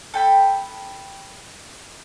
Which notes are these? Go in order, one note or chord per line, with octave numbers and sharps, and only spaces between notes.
A4 G5 B5